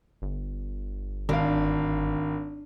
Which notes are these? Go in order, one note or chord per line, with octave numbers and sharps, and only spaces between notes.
G1
G#1 D4 F5